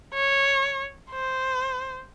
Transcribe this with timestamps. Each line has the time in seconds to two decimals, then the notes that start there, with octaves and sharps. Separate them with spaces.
0.14 C#5
1.11 C5